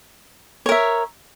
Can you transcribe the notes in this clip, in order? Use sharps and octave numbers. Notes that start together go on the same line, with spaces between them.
A#4 C#5 E5